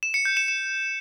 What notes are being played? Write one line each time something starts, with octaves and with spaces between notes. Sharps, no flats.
E7
C#7
G6
E7
E7